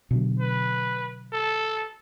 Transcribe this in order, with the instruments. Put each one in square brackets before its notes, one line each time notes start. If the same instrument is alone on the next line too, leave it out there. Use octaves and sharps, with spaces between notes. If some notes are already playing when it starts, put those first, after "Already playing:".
[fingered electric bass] B2 D3 F#3
[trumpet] B4
A4